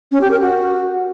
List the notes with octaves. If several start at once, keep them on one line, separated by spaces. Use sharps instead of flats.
C#4
G4
A#4
F#4